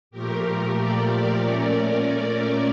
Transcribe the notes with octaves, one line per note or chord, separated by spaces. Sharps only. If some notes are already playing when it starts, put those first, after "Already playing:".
A#2 F3 A3 G4 A#4
A#4 D5
A#2 A3 C#4